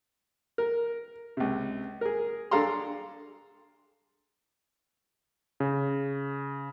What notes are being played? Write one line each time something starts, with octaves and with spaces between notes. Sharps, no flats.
A#4
C#2 C3
G#4 A#4
D4 G#4 A4 F5 A#5 C6
C#3